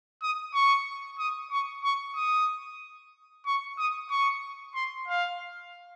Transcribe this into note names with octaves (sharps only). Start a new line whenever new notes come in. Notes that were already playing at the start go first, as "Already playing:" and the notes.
D#6
C#6
D#6
C#6
C#6
D#6
C#6
D#6
C#6
C6
F5